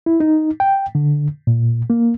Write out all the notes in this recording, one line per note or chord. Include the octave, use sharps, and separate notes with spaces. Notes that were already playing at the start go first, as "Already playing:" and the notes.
E4
D#4
G5
D3
A#2
A#3